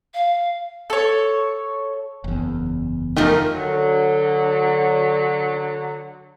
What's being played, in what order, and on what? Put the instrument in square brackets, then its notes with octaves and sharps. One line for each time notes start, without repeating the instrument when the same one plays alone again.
[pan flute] F5
[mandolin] A4 C#5
[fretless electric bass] F#1 E2
[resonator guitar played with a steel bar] F3 A3 D#4 [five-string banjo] G4 A#4
[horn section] D3 F#3